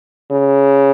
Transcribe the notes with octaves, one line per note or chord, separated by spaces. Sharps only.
C#3